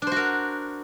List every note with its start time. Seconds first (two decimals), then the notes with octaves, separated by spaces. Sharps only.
0.02 D4
0.07 C5
0.12 F#4
0.16 A#4